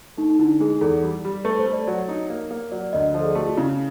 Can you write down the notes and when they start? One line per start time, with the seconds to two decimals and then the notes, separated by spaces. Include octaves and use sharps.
0.17 A3 D#4
0.30 D#4
0.39 D3 E4
0.60 G#3 G#4
0.81 E2 A4
1.03 G3
1.24 G3
1.44 A3 B4
1.59 C5
1.66 A3
1.73 D5
1.87 F#3 C#5
2.08 D#4
2.30 A#3
2.51 A#3
2.72 F#3 D5
2.93 D2 D#5
3.14 F3 D5
3.21 A4
3.25 G#4
3.35 A3 F#4
3.46 F4
3.57 C#3 E4